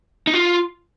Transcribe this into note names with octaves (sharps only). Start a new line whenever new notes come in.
D#4
F4